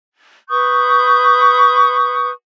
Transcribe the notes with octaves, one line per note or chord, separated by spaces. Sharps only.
B4 C#6 D#6 G6